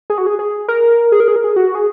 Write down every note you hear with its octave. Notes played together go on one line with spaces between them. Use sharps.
G#4
F#4
G#4
G#4
A#4
G#4
A#4
G#4
A#4
G#4
F#4
G#4